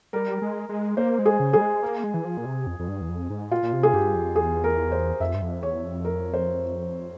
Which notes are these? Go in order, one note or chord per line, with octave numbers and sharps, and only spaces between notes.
G3 A#4
G#3
G#3
A#3 C5
G#3
G#4
C#3
G3 G#4
G#3
A#3
G#3
E3
F3
A#2
C3
F2
F2
G2
E2
F2
G#2
A#2 F4
A#2
C3
G#4
G2 G4
F2
E2 G#4
A#4
C5
F2 E5
G2
F2
E2 C#5
F2
A#4
C5